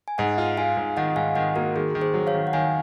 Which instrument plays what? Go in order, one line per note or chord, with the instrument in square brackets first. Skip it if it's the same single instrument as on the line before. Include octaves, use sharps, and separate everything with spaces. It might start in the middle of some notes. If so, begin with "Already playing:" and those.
[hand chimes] G#5
[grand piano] G#2 [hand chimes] D#5 F#5
[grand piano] F4
[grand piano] F4 [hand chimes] F5 G#5
[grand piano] G#2
[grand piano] D#3 [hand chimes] D#5 F#5
[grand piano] G#2 [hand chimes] F5 G#5
[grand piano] D#3 [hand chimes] D#5 F#5
[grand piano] A#3 [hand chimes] F#4 A#4
[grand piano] D#3 [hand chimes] G#4
[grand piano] D#3
[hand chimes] G#4 C5
[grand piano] F#3
[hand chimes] C#5 F5
[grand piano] D#3
[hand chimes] F#5
[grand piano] D#3 [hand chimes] F5 G#5